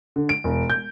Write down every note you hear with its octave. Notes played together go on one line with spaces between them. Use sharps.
D3
D7
E1
G6